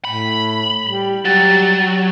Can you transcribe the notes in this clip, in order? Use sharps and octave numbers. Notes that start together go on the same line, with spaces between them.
A2 B5
G3
F#3 G3 A6